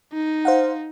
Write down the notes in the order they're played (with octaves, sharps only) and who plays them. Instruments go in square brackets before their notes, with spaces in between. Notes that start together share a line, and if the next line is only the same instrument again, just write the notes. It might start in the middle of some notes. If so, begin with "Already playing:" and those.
[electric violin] D#4
[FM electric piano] C5 F5 F#5